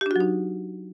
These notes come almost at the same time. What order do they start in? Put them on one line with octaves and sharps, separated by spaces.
G4 D4 F#4 F#3 D#4